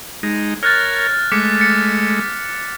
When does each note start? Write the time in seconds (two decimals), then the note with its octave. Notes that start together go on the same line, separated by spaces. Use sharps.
0.23 G#3 D#4
0.63 A#4 C#5 F6 F#6 A6
1.32 G#3 A3 D6 B6 C#7
1.60 A6 C#7